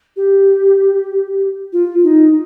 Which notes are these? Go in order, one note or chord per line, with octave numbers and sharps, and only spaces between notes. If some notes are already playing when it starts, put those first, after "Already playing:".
G4
F4
D#4